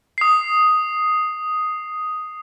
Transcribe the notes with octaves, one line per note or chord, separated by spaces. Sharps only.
D#6 C7